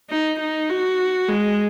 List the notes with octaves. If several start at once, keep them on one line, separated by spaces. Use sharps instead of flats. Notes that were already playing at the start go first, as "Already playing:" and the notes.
D#4
D#4
F#4
G#3